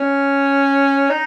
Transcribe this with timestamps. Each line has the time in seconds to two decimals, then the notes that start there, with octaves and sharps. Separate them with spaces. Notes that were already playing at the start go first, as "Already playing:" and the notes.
Already playing: C#4
1.10 D#4